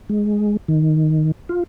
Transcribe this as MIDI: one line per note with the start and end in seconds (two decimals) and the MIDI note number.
0.09 0.57 56
0.68 1.32 51
1.49 1.63 65